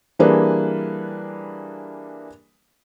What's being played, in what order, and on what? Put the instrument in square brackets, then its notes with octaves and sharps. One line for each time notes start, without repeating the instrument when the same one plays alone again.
[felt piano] E3 G3 A#3 D4 G#4 B4